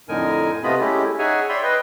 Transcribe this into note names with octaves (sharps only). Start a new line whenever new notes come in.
F2 A2 D3 D#4 A#4 G#5
C3 A3 B3 F4 D#5 B5
G#3 A3 C#4 E4 G4
D#4 G#4 C#5 E5 F#5 G#5
C#5 D5 E5 G5 B5 C6
B4 D#5 G5